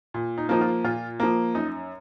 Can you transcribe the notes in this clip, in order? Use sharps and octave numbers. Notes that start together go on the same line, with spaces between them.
A#2
D#4
F3 A#3 D#4
F4
A#2 F4
F3 A#3
F#2 D#4